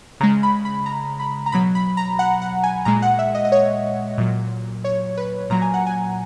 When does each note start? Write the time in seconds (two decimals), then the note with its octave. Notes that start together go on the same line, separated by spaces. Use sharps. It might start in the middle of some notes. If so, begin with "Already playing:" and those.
0.20 C#3 A#5
0.23 G#3
0.43 B5
0.65 B5
0.86 A#5
1.20 B5
1.46 A#5
1.52 B2 F#3 B5
1.75 B5
1.97 A#5
2.19 F#5
2.42 F#5
2.64 G#5
2.85 A#2 G#3 A#5
3.02 F#5
3.19 E5
3.35 D#5
3.45 D#5
3.52 C#5
4.18 A#2 F#3
4.84 C#5
5.17 B4
5.50 A#2 F#3 A#5
5.62 G#5
5.74 F#5
5.87 G#5